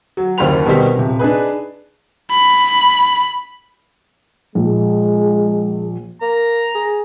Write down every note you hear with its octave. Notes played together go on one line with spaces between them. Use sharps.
F#3
F#1 D#2 A#3 C5 B5 F7
B2 D#3 G3 C4 D#4 G4
D#1 C3
D4 D#4 G#4 B4
B5
A#1 G#3
A#3 A#5
G#4